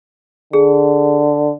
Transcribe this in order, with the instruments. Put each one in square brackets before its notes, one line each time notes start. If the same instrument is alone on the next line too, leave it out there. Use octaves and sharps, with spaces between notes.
[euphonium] D3 [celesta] G#4